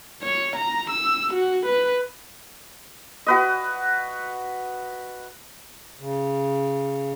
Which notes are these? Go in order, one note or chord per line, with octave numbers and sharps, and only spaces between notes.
C#5
A#5
E6
F#4
B4
F#4 B4 D#5
C#3